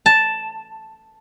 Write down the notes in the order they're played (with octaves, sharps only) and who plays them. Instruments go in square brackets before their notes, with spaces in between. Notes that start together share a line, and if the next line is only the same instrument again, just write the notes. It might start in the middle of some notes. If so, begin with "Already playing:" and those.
[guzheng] A5